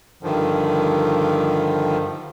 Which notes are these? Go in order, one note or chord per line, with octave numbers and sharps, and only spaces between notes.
G2 D3 D#3 F3